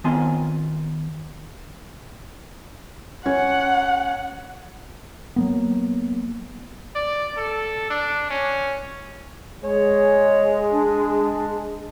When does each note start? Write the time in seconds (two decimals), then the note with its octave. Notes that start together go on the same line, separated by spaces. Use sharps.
0.04 D#3 B3 C4 F4 G#5 C6
3.26 C#4 F#5
5.36 F#3 A#3 B3
6.95 D5
7.37 A4
7.90 D4
8.30 C#4
9.63 G#3 C#5
10.71 D4